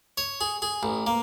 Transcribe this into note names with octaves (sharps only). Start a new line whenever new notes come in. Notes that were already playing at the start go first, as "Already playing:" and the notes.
C#5
G#4
G#4
A1
A#3